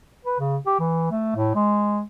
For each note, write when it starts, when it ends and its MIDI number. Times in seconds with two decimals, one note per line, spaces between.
0.25 0.37 71
0.39 0.57 49
0.67 0.79 67
0.80 1.08 52
1.11 1.35 57
1.36 1.55 45
1.55 2.02 56